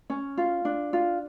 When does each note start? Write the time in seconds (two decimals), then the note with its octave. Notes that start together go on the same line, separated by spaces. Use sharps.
0.10 C#4
0.38 F4
0.65 D4
0.93 F4